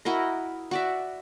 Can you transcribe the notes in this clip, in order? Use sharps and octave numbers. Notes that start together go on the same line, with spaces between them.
E4 F#4 A#4 D#5
F#4 D5 E5